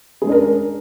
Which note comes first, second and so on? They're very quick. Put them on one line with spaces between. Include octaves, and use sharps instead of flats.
G#4 G#3 C#4 D4 A#4